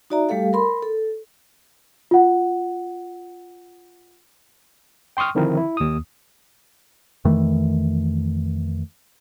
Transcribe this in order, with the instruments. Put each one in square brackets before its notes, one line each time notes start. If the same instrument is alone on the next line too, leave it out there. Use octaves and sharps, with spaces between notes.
[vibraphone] D#4 F#4 D5 E5 A#5
G3 A3 G4 A4 F5
A#4 B5 C6
A4
[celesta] F4 F#5
[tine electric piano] G5 C6 C#6 D#6 F6
D3 D#3 F3 C4 E4 A#4
E4
D#2 D#6
[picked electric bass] F2 D#3 E3 A3